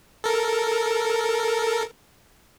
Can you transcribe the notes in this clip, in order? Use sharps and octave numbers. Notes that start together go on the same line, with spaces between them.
A4 A#4